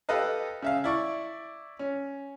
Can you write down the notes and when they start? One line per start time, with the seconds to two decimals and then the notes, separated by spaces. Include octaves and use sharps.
0.09 G4 A4 B4 D#5 F5
0.62 C#3 E5 F5
0.84 E4 D5 C#6
1.79 C#4